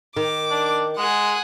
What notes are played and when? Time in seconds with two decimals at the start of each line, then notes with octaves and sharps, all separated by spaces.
0.17 D#3 D6
0.50 D4
0.97 G#3 G#4 F#5